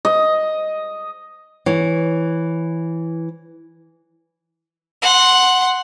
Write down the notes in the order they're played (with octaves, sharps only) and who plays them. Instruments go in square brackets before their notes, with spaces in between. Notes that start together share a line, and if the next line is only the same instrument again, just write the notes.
[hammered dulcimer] D#5
[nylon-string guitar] E3 C#5
[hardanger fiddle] F#5 C6